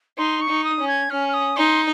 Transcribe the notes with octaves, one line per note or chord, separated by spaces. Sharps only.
D#4 C6
C#6
D#4
D#6
C#4
G#6
C#4 F6
F6
D#6
D#4 C6